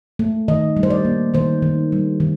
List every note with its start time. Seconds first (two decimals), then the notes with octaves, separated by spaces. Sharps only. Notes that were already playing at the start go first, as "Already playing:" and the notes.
0.19 A3
0.48 D#3 D#5
0.77 G3
0.83 C5
0.90 D5
1.05 A#3
1.34 D#3 C5
1.62 D#3
1.92 G3
2.20 D#3